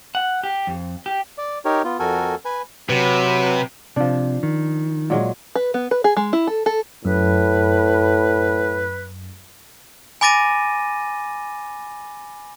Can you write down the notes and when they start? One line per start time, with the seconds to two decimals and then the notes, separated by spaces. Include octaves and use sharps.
0.15 F#5
0.43 G4
0.67 F2
1.06 G4
1.38 D5
1.65 D#4 G4 A#4 C#5
1.84 B3 F4
1.99 F2 F#4 A4 A#4 G#5
2.45 B4 G#5
2.90 C3 F#3 B4
3.96 C3 F3 D4
4.43 D#3
5.10 A#2 F#3 G#3
5.55 B4
5.74 B3
5.91 B4
6.04 G#4
6.17 G#3
6.33 E4
6.47 A4
6.66 A4
7.05 F#2 A2 B4
10.21 G#5 B5 D6 A6 A#6 D#7